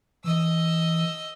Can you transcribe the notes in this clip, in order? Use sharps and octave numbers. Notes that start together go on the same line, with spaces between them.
E3 D#5 E6